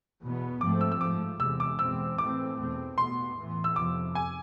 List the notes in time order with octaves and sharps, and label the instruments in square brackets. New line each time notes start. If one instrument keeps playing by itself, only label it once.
[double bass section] E2 B2 B3
[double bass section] G#2 F3 A3 C4 [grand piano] D6
[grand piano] E6
E6
[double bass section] G#2 F3 A3 [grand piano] D6
[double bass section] E2 C3 G#3 [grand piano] E6
[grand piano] D6
[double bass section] E2 B2 G#3 C4 [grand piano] E6
[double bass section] A2 E3 A3 C4 [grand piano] D6
[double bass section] E2 B2 A3 C4
[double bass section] B2 B3 [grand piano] C6
[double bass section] A2 E3 B3
[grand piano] E6
[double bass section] F2 C3 F3 [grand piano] D6
[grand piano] G#5